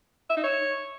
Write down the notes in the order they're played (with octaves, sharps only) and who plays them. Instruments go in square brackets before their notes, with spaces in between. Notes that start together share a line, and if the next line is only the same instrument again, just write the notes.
[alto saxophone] E5
D#4
C#5